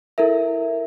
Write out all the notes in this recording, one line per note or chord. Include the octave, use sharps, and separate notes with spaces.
E4 A4 A#4 E5